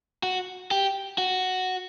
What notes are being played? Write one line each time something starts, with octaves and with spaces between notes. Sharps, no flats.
F#4
G4
F#4